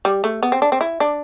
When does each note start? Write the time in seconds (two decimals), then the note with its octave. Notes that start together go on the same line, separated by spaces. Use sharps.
0.05 G3
0.24 A3
0.43 B3
0.52 C4
0.62 D4
0.72 C4
0.81 E4
1.00 D4